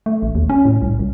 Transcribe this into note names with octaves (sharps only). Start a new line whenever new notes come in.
A3
A1
D#2
C#4
A2
C2
C2